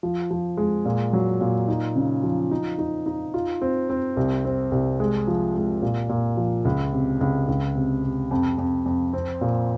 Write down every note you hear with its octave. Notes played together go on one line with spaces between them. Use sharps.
F3
F3
G#3
A#2
F#3
A#2
D#4
C#3
F3
D#4
D#4
D#4
F4
C4
C4
C2
C4
C2
G#3
F3
G#3
A#2
A#2
F3
C#2
C3
C#2
C#2
C3
C3
F2
F2
F2
C4
A#2